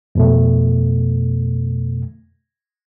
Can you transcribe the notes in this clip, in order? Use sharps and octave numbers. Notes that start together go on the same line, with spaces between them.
F2 B2 A3